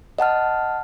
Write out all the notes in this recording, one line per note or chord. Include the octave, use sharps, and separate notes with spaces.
D#5 F#5 A5 F6